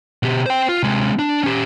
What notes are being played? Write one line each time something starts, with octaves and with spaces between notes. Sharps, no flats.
B2 G4
C5 G5
F4
C3 G#3
D4
C#4 G4